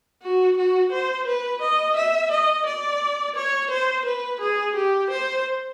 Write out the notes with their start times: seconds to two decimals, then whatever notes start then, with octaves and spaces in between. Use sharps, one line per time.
0.23 F#4
0.57 F#4
0.91 C5
1.26 B4
1.61 D#5
1.96 E5
2.31 D#5
2.66 D5
3.36 C#5
3.71 C5
4.06 B4
4.40 G#4
4.75 G4
5.10 C5